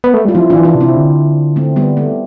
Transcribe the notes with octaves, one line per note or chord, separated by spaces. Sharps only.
B3
A3
G3 F4
F3 C4 E4
E3 D4 F4
D4 F4
C3
C4 E4
D3
A3 C4
G3 B3
A3